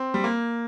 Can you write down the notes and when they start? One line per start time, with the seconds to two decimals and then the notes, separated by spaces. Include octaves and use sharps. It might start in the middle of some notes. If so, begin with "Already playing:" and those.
Already playing: C4
0.14 G3
0.24 A#3